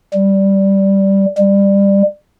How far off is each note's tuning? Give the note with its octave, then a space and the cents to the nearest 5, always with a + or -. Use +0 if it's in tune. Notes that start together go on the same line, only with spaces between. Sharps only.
G3 -5
G3 +20